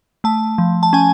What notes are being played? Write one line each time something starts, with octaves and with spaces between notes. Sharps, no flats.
A3 A5
F3
A5
C#4 G#5